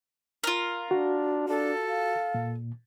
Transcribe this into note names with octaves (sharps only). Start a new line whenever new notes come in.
F4 A#4
D4 F#4
D4 A4
F5
A#2